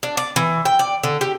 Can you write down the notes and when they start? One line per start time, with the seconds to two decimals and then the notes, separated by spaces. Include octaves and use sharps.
0.03 D4
0.17 D5
0.36 E3
0.65 G5
0.79 D5
1.03 D3
1.21 G4